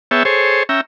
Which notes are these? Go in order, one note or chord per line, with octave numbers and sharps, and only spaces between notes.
B3 G#4 C#5 E5 G5 A5
G#4 A4 C5 C#5
C#4 E5 G5 A#5